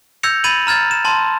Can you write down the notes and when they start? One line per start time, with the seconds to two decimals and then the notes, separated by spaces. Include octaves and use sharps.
0.23 E6 G6 G#6 A#6 C#7 F7
0.44 B5 G#6 A6 D#7 F7 F#7
0.67 A#5 F6 G#6 A6
0.91 E7
1.05 A5 C6